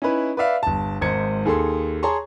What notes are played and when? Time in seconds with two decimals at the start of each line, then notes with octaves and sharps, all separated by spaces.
0.02 C#4 D#4 E4 B4
0.37 B4 D5 E5 F5
0.63 G1 A5
1.01 G#1 G#2 C5 G#6 C#7
1.45 D#2 G#4 A4 C6
2.03 G#4 C#5 A5 A#5 C6 C#6